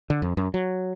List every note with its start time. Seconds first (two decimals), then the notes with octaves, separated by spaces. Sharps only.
0.10 D3
0.22 F2
0.37 F#2
0.54 F#3